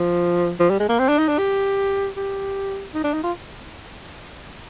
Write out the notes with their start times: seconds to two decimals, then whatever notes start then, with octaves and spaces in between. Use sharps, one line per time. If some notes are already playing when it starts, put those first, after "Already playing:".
Already playing: F3
0.60 F3
0.70 G3
0.80 G#3
0.89 A#3
0.99 C4
1.09 D4
1.19 D#4
1.28 D4
1.38 G4
2.16 G4
2.94 D#4
3.04 D4
3.13 D#4
3.23 F4